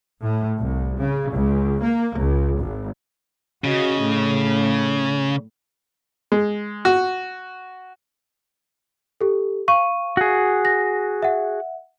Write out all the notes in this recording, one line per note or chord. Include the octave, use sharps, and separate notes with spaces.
A2
C2
C#3
C#2
A#3
C#2
G#1
C#3 F#4 D#5
A2
G#3
F#4
G4 A4
F5 C#6 D#7
F#4 G#4
A#6
E5 F#5